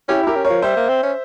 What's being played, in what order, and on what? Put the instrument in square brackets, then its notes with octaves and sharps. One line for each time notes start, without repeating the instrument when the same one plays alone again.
[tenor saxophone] C#4 [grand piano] E4 G4
[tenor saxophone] E4 [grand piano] G4 A#4
[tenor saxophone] C#4
[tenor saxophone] F3 [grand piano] A#4 C#5
[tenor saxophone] G3 [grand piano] C5 E5
[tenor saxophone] A#3
C4
C#4